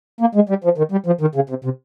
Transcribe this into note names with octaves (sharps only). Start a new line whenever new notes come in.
A#3
G#3
G3
F3
D#3
G3
F3
D#3
C#3
C3
C3